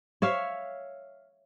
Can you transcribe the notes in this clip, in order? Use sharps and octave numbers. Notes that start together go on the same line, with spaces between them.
C#5 E5 F5